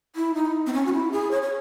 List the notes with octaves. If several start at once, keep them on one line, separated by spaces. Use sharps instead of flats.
E4
D#4
C4
C#4
F#4
E4
G#4
C#5
C#5